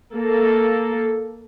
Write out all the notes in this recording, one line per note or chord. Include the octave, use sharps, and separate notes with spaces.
A#3 A4